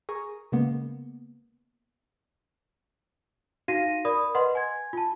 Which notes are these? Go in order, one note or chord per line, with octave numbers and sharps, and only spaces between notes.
G#4 A#4 G#5 A#5 C#6 D#6
C#3 G#3 A#3 B3
D#4 F#4 F5 A#6 D#7
A#4 D5 B5 D#6
B4 D#5 F#5 C6
G#5 G#6
F4 A5